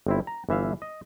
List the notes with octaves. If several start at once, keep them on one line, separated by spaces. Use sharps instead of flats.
G1 C4 E4
A#5
G1 E3 E5 F5
D#5